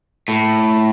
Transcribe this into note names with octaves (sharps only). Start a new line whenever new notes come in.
A2